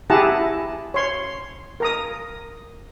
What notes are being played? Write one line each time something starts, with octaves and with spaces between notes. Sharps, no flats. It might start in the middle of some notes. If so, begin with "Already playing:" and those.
E4 G4 G#4 F#5 A5 A#5
C#5 C6
A#4 A#5 D#6